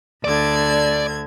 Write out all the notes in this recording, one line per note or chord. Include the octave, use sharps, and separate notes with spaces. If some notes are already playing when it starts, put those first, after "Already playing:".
D2 D3 D5 G#6